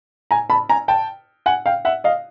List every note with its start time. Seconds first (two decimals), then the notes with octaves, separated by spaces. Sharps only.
0.31 G#5 A#5
0.50 A5 B5
0.70 G#5 A#5
0.88 G5 A5
1.46 F#5 G#5
1.66 F5 G5
1.85 E5 F#5
2.04 D#5 F5